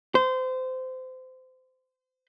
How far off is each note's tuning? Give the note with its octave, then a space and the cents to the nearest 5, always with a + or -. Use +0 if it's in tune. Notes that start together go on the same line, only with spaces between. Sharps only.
C5 -25